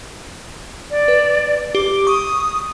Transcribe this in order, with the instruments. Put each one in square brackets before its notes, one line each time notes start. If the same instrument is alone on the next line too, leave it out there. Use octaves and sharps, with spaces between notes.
[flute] D5
[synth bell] B4
[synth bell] G4 [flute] D6
[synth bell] C#6 [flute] D#6